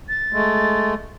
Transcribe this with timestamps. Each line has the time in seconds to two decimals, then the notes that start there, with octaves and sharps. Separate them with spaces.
0.09 A6
0.33 G#3 A3